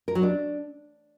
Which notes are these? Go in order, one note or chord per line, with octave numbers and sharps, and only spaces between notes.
A#4
F#3
D4